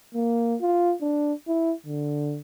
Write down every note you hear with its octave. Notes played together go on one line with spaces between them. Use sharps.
A#3
F4
D4
E4
D3